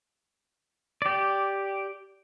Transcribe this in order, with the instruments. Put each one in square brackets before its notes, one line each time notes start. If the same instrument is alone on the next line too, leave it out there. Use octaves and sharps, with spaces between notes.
[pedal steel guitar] G4 D5